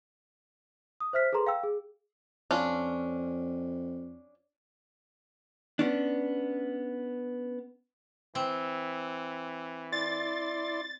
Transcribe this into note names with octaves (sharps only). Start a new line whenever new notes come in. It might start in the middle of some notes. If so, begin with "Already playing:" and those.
D#6
C5 E5 F6 B6
G#4 A4 B4 A#5 C6
F5 G5 E6
G#4
F2 C#4 D4 F4
B3 C#4 D4
E3 C4
E4 D5 C6 A6